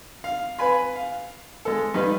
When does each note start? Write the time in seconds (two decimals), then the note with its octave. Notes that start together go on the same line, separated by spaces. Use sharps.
0.24 F5
0.59 B4 G#5 B5
0.95 F5
1.65 G#3 A4
1.94 G2 D#4 B4